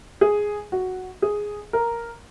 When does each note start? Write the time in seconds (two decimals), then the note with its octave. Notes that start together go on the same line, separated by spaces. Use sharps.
0.21 G#4
0.72 F#4
1.22 G#4
1.73 A#4